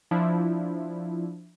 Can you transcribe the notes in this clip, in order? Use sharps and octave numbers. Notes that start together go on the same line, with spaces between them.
F3 D4 E4